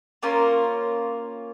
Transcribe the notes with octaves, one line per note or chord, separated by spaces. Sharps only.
A#3 C#4 F4 A#4